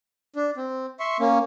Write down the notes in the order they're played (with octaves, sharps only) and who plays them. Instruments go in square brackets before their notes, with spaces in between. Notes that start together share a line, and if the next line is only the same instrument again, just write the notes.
[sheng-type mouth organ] D4
C4
E5 C6 C#6
A#3 C#4